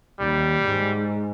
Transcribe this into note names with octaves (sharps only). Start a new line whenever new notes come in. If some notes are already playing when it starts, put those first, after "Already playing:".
D#2 G3
G#2